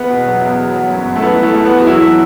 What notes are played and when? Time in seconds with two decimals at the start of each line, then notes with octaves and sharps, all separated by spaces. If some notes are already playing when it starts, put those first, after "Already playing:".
Already playing: E2 B3
0.10 B2
0.26 F#3
0.42 E2
0.58 F#3
0.74 F#3
0.90 F#2
1.06 F#2
1.16 A3
1.22 E3 B3
1.38 E3
1.43 A3
1.54 E2
1.65 E2 B3
1.79 F#4
1.86 E3 F#3 E4
2.02 F#3